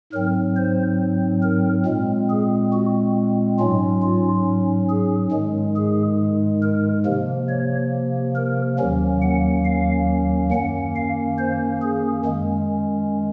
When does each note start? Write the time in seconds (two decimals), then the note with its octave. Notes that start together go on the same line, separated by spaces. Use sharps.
0.13 G#2 F#3 C4 A#4
0.56 C5
1.43 A#4
1.86 A#2 G#3 C4
2.30 G#4
2.72 F#4
3.59 G#2 F#3 C#4 F4
4.02 F4
4.89 G#4
5.32 G#2 D#3 G#3
5.76 G#4
6.62 A#4
7.06 C3 F3 A#3
7.49 C#5
8.35 A#4
8.79 D#2 D#3 F#3 A#3 C#4
9.22 F#5
9.65 F5
10.52 F#2 D#3 A#3 C#4 F#5
10.96 F5
11.38 C5
11.82 G#4
12.25 F#2 D#3 G#3 C#4